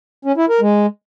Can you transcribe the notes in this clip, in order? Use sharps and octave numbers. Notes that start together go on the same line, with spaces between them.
C#4
E4
A#4
G#3